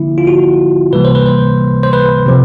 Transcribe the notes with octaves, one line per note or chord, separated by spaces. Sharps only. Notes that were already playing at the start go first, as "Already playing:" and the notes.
Already playing: D3 F3 A#3 E4
F4
F#4
C3 E3 G3 A#3 B4
C5
B4
C5
C5
B4
C3 F3